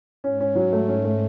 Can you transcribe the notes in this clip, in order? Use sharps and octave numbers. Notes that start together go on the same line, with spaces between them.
G#2 C#4
C#4
F#3
A3
C#4
A3